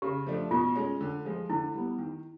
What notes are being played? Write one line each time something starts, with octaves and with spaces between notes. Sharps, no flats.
C#3 G4
F3 A3 D4
B2 F4
G#3 C#4
D3
F3 G#3
D3 E4
G3 B3
D#3